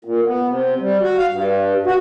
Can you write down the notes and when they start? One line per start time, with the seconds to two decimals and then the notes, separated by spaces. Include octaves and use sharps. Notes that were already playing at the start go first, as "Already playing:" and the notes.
0.05 A#2
0.25 B3
0.48 C3
0.80 G3
1.02 F#4
1.18 F5
1.32 G2
1.86 F#4